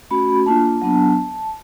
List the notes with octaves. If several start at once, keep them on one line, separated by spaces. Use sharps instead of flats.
A3 C#4 F#4 B5
A#3 D4 F4 A5
F#3 B3 D4